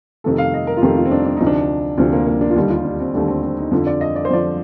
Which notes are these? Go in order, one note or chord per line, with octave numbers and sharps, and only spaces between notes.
F2 C3 D#3 A3 A4
F5
D#5
A#4
F4
F2 C3 D#3 A3 G4
F4
C4
D4
D4
D2 C3 F3 D#4
D4
D2 C3 F3 C4
A#3
A#3
D4
F4
D#2 D3 G3 D#4
F4
D4
C4
D#2 D3 G3 A3
C4
C4
D#4
F2 D3 F3
D5
D#5
D5
C5
F2 D3 F3 D5